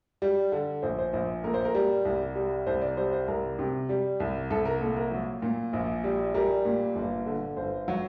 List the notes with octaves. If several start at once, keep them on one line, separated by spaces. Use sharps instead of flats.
G3
D3
A#1 C5
C5
A#1 C5
A#2 A#4
C5
A#4
G3
C2
G3
C2 C5
D5
G3 C5
C5
C2 A#4
C3
G3
C2
C2 A4
A#4
A#2 A4
A#4
F#3
A#2
A#1
G3
G3 A#4
A#2
G1
D3
G1 C5
F#3